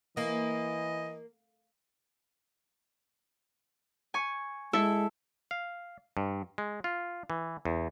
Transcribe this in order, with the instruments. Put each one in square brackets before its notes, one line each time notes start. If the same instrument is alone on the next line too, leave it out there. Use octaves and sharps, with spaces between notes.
[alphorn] E3 [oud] A#3 [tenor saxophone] D#5
[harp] G#5 C#6
[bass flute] G#3 [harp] E4 A4 E5
[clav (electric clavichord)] F5
G2
G#3
F4
E3
E2